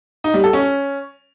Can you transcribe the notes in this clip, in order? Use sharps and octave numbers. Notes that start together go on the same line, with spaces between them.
D#4
G3
A4
C#4